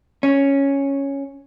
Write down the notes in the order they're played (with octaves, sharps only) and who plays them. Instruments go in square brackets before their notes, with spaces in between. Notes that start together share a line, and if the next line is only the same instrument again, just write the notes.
[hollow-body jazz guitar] C#4